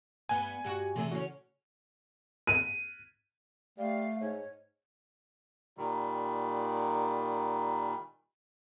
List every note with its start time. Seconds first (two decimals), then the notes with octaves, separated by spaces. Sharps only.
0.29 G2 B3 G#5
0.64 G2 F#4 G4
0.96 C3 E3 A3 G#4
1.11 C#3 C#4 F#4
2.47 D#7
3.78 G3 A3 F5
4.21 G#2 C#5
5.77 A#2 D#3 G3